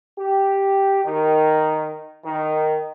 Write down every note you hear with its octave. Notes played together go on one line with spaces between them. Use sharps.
G4
D#3
D#3